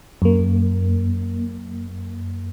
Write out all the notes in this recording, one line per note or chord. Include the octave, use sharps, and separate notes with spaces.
F#2 A#3